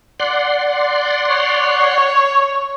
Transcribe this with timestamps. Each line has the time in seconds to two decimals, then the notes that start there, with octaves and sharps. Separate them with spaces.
0.20 D5 F#5 C6
1.29 C#5